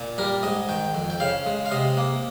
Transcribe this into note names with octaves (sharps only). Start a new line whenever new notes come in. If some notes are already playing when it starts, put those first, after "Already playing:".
Already playing: A#2
G3 A#4
G#2 D#5
D#3 G5
F2
G5
C#3 F5
G#3
F5
C3 D#5
A#3